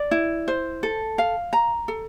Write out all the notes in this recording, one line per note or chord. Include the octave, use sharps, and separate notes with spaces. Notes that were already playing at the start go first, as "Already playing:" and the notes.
Already playing: D5
E4
C5
A4
F5
A#5
A4